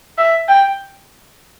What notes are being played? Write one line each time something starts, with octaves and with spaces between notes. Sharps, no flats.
E5
G5